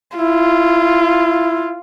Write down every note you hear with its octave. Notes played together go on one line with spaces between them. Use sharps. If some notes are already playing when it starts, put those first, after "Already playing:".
E4 F4